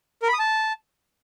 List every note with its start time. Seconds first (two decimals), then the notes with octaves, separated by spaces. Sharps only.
0.22 A#4
0.28 B5
0.34 D#6
0.39 A5